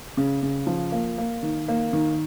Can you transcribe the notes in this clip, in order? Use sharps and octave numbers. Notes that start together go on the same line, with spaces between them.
C#3
C#3
F3
A#3
A#3
D#3
A#3
D#3